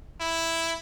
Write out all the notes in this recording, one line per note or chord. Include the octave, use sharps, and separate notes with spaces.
E4